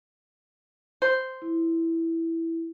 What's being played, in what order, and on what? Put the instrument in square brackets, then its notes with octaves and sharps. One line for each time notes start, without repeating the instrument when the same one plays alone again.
[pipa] C5
[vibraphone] E4